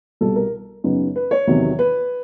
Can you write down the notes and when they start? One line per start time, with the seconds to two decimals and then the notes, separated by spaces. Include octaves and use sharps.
0.21 C2 B2 G3 A4
0.36 A#4
0.84 F#2 C#3 F#3 B3 D#4
1.16 B4
1.31 C#5
1.47 E2 C3 D#3 F#3
1.79 B4